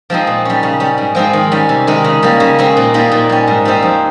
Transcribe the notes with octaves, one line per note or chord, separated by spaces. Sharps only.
F3 G#3 C4 D#4
A#2
G3 C#4
C#3
G3 C#4
G#2
F3 G#3 C4 D#4
D#3
G3 C#4
C3
D#3 G#3 D#4
C#3
G3 A#3
C#3
G#3 C4 D#4
A#2
G3 A#3 D#4
A#2
G3 C#4
G#2
G3 C4 D#4
F2